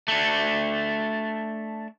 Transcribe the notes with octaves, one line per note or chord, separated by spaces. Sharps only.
A3 D4